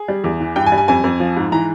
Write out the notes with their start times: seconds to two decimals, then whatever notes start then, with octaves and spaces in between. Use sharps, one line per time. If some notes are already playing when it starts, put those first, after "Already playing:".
Already playing: G#4
0.08 G3
0.24 E2
0.40 E3
0.56 G2 G5
0.66 G#5
0.72 G3
0.78 G#5
0.88 F2 G#5
1.04 F2
1.20 F3
1.37 G#2
1.52 E3 A#5